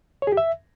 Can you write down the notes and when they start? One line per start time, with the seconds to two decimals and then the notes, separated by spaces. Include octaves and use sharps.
0.22 C#5
0.27 G#4
0.32 G4
0.37 E5